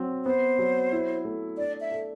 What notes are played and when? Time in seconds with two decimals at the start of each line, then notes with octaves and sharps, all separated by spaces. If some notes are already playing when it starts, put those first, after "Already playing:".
Already playing: F#3 C4
0.25 B3 C5
0.59 F#3
0.92 E4
1.25 A3
1.57 D4 D5
1.81 E5
1.91 A4